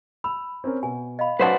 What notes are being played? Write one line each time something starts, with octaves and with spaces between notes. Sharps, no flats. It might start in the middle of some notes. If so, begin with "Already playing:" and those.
B5 E6
C4 C#4 A#4
B2 G#5
D#5 F5 B5
F#3 C#4 B4 C5 D5 F#5 A5 D6